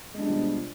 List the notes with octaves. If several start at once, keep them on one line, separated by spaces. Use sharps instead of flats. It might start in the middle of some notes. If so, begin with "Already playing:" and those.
B2 F3 G3 G#3 D4